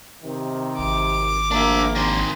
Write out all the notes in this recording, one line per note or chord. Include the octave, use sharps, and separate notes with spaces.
C3 D#3
G#1 D6
A#1 F3 A#3 D4 E5
D#3 C4